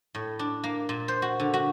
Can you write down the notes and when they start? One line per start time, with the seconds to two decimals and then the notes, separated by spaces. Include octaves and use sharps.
0.15 A2
0.39 D4
0.64 A#3
0.89 A#2
1.08 C5
1.22 F#4
1.40 D3
1.54 F#4